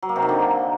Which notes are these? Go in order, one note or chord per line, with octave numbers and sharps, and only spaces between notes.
F#3
A#3
C3
D#3
D3